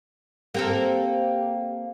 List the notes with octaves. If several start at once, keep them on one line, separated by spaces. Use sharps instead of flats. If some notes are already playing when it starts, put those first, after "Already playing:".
A#3 C4 G4 A4